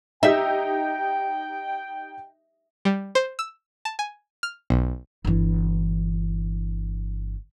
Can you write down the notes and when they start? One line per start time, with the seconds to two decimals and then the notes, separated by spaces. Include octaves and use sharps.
0.23 D#4 G4 D#5 E5 G5
2.85 G3
3.15 C5
3.39 E6
3.85 A5
3.99 G#5
4.43 F6
4.70 B1
5.25 G1 E3